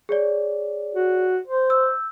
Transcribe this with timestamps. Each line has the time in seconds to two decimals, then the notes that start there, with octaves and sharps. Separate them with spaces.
0.09 G#4 C#5 D5
0.95 F#4
1.47 C5
1.70 E6 G6